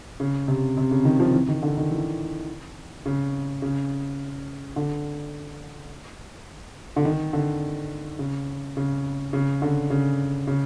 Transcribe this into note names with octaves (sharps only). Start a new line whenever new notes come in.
C#3
C3
C3
C#3
D#3
F3
E3
D#3
D3
D#3
E3
C#3
C#3
D3
D3
D#3
D3
C#3
C#3
C#3
D3
C#3
C#3